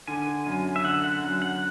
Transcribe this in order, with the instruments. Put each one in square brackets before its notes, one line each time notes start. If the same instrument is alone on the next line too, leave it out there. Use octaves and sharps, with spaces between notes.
[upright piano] D3 [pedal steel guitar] G#5
[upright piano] F#2
[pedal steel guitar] E5
[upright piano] D3 [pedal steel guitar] F#5
[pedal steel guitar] F#5
[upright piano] F#2
[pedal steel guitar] F#5